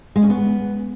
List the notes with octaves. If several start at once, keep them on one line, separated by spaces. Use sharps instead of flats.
G#3
C#4
B3